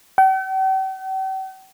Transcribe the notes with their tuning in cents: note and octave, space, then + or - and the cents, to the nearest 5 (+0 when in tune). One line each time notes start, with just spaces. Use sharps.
G5 -45